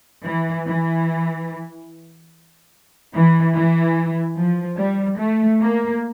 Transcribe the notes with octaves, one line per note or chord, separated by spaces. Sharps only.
E3
E3
E3
E3
F3
G3
A3
A#3